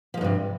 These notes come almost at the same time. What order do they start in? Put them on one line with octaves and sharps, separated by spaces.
F3 E2 G2 C3